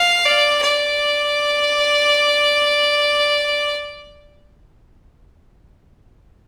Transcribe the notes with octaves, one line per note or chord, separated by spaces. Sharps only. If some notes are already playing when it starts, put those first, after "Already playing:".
Already playing: F5
D5
D5